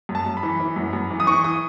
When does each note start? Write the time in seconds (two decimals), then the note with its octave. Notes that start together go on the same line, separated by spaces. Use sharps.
0.09 F#2
0.15 A5
0.26 F#2
0.37 B5
0.43 E3
0.60 E3
0.76 F#2
0.93 F#2
1.11 E3
1.20 D#6
1.27 E3 C#6
1.44 D#6